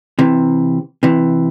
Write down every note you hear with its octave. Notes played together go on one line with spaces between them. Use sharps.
C3 E3
C3 E3